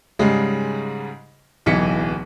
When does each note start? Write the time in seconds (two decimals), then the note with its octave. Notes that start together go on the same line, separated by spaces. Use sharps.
0.19 G#2 C#3 G3 G#3
1.66 D1 B1 E3 B6 C#7